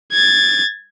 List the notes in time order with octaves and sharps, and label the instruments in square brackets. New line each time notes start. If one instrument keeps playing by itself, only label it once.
[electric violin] G#6 A6